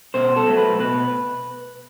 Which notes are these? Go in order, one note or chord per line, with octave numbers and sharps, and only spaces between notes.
B2 C5
A4
F#3 A3
B4
B2 B4